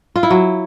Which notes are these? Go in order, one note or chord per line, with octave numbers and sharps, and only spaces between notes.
F4
E4
F#3